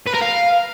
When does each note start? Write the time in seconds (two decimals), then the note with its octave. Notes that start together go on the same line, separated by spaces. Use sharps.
0.07 B4
0.15 A#4
0.22 F5